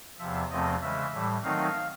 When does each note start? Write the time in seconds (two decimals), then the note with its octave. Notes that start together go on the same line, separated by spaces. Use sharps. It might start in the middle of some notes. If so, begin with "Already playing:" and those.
0.18 E2 C3 F3 E5
0.50 E2 C3 F3 A3 C4 D#5
0.81 C#3 E3 G#3 E5
1.13 A2 E3 G3
1.43 D#3 F#3 A3 C4 D#4 F5